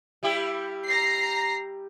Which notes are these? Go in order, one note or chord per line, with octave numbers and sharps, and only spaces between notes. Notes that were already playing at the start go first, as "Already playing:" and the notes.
G3 E4 G4
A#5 A#6 C7